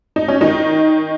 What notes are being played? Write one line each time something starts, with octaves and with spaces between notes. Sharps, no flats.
D#4
C#4
D#3 D#4